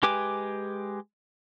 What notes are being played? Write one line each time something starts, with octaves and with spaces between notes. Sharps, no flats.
G#3 G4 B4 G#5 D6